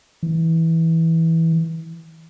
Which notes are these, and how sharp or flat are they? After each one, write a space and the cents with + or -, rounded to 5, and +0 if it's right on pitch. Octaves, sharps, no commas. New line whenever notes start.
E3 -15